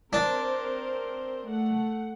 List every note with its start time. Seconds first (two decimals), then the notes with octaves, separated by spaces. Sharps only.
0.13 C4 D4 A#4 C5
1.48 A3 F#5